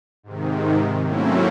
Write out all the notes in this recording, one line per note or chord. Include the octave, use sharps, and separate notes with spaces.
G#2 C3 D#3
F#3 A3 A#3 C4 C#4 E4